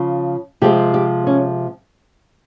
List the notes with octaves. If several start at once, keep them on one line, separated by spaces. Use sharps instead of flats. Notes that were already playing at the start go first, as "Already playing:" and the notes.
Already playing: C#3 F3
C3 F3 G#3 C4 G4
G4
C#4